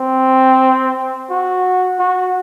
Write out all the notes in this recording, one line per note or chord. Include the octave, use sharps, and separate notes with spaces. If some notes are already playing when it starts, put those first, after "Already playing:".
Already playing: C4
F#4
F#4